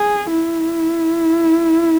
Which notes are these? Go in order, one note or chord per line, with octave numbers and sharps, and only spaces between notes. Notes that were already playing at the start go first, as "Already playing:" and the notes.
Already playing: G#4
E4